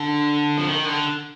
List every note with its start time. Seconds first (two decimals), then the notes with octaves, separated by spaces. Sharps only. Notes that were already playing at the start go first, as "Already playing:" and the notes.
Already playing: D3
0.57 F3
0.67 D#3
0.85 D3